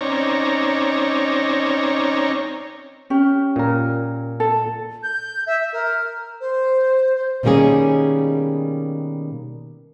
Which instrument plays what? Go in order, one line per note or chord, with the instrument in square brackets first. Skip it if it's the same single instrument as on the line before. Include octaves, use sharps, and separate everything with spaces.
[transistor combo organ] C4 C#4 D#4 C#5 D5 A#5
[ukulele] C#4 G4
[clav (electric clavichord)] A#2 A#4
[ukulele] A4
[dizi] G6
E5
A#4
C5
C5
[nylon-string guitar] B2 D#3 G3 A#3 C#4 G#4